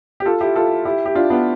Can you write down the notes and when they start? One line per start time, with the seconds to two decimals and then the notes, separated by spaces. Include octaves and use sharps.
0.20 G4
0.26 F4 A4
0.41 E4 G4
0.56 F4 A4
0.85 E4 G4
1.05 G4
1.15 D4 F4
1.30 B3 D4